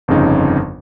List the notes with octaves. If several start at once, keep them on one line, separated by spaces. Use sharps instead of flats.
G1 F2 C#3 D#4